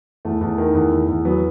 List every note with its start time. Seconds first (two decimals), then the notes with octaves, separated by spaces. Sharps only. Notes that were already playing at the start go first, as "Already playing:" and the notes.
0.25 E2 A3
0.41 E2
0.58 D#3
0.74 E2
0.91 E2
1.09 E2
1.25 F#3 B3